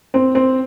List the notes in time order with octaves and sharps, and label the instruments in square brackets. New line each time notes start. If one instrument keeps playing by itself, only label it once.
[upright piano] C4
C4